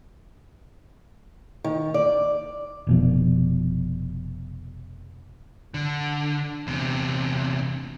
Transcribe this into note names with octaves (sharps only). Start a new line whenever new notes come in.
D#3
D5
F1 B2 F3
D3
E2 C3